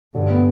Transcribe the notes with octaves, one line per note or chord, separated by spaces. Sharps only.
G2 D3
B3